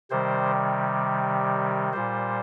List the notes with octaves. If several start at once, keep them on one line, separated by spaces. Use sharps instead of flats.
C3 D#3 G3 C5
A#2 G3 C5